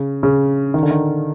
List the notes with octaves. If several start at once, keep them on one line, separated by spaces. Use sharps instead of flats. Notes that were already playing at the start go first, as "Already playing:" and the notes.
Already playing: C#3
C#3
D#3
D3
D#3